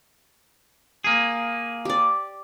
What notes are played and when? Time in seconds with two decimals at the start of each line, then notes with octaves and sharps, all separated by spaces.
1.04 A#3 G#4
1.85 G4 D5